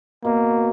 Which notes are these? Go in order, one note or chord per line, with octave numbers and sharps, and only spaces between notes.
B2 A#3